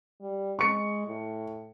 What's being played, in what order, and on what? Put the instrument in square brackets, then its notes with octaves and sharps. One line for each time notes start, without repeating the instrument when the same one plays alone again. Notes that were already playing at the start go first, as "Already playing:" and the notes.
[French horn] G3
[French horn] G#3 [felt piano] C#6 C#7
[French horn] A2